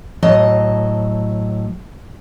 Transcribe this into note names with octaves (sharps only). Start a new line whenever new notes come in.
A2 F#3 D#5 A5